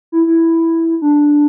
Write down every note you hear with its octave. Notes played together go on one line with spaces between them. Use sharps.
E4
E4
D4